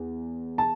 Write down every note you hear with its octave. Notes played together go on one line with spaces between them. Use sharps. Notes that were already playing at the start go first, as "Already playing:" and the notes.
Already playing: E2
A5